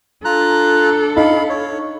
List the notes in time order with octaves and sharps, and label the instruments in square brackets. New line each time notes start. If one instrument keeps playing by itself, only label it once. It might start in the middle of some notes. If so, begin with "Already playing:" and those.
[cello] D4 A4 [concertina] F4 A#5 F#6
[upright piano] D#4 [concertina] F5 B5
[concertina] C#5